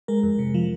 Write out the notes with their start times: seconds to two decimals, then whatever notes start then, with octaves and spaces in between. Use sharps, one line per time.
0.08 G#3 A#4
0.23 F2
0.39 C3
0.55 F3